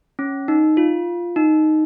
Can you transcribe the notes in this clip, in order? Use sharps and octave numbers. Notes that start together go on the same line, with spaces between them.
C#4
D#4
F4
D#4